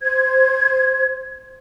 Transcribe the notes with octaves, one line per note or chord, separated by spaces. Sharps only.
C5 G#6